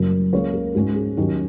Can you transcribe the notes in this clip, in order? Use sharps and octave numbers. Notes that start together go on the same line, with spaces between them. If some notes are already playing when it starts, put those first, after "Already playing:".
Already playing: F#1 F#2 F#3 A#4
C#2 C#3 A#3 C#5
A#4
G#2 G#3 C#4 F#4
G#4
D#2 D#3 F#3 C#4 D#4